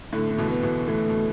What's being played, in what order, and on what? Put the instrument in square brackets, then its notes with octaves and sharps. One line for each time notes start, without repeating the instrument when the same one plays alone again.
[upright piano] A2 D3 [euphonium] A3
[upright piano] D3
B2 E3
[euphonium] B3
[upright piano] B2 E3
[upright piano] E3 [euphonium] A3
[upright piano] D3
B2